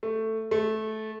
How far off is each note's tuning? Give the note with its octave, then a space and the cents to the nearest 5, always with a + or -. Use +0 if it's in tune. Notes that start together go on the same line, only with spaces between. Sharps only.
A3 +10
A3 -15